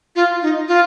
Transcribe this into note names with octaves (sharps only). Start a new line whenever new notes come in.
F4
D#4
F4